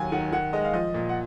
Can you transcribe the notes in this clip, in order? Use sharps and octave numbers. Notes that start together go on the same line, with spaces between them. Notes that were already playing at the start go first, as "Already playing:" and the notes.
Already playing: D#2 F#3 G#5
D#3 F#5
D#3 F#5
G#3 D#5
F5
F3 D#5
A#2
F#5